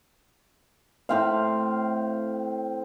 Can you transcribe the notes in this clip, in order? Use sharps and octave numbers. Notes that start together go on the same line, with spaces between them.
A2 C4 F5